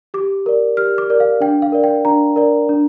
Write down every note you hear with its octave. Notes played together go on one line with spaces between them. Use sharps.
G4 D6
A#4 D5
G4 F6
D6
A#4 D5
F5
D4 G5
F5
A#4 D5
G5
D4 A#5
A#4 D5
D4